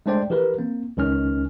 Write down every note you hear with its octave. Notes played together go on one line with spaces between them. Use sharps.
G#3 A3 D4 C5 D5 G5
E3 G4 A#4 B4
A#3 C4
C#2 D#3 C#4 F6